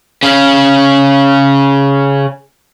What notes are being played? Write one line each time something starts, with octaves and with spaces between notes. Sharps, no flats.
C#3 C#4